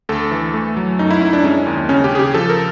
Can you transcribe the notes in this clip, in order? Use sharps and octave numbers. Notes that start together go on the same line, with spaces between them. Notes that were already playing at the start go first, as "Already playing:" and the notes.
D2 A4
E3
A3
F#3
F#2 D#4
E4
F#2 D#4
D4
G#3 C#4
D#2
C#3 C#4
G4
C#3 G#4
G4
F3 A4
A#4